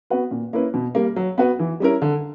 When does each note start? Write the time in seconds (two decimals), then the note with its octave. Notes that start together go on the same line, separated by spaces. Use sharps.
0.10 B3 F#4 B4
0.31 A#2
0.53 A#3 C#4 E4 B4
0.74 B2
0.95 G3 A#3
1.16 F#3
1.38 B3 F#4 B4
1.59 E3
1.80 G3 C#4 E4 A#4
2.02 D3